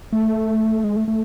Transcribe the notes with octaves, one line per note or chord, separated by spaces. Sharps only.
A3
G#3
A3
A3